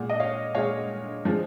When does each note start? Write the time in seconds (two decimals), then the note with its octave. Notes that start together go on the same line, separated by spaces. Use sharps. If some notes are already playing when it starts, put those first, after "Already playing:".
Already playing: A#2 G#3 F#5
0.10 D#5
0.20 C#5 F5
0.55 A#2 G#3 C#5 F5
1.25 F3 G#3